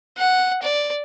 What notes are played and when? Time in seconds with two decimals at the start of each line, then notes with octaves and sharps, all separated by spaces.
0.17 F#5
0.62 D5